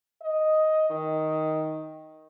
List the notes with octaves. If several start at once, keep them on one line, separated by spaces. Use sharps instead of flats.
D#5
D#3